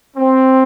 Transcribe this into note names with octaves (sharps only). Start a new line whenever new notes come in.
C4